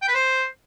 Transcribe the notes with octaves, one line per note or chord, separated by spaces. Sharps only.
G5
B4
C5